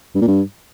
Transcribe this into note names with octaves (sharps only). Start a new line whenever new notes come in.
G2
A#2
G2